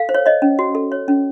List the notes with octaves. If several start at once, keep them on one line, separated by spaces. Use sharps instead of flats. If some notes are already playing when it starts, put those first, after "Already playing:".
Already playing: A4 F5
C5
C#5
C#5 D#5
C#4
F#4
A4
C#5
C#4